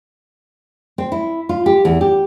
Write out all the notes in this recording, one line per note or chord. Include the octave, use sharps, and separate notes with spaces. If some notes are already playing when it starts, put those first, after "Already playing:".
C4
E4
F4
G4
E2
G4